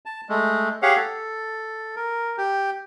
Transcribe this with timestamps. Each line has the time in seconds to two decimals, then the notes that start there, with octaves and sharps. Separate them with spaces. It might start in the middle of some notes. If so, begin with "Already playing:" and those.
0.06 A5
0.29 G#3 A3
0.82 G4 G#4 C#5 F5 F#5
0.96 A4
1.96 A#4
2.38 G4